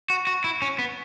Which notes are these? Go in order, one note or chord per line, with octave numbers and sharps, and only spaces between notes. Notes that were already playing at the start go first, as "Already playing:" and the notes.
F#4
F#4
E4
C#4
B3